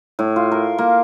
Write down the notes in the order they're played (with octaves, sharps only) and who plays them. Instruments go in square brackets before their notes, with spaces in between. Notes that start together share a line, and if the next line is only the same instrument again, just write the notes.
[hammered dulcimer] A2
F4
A#4
A#3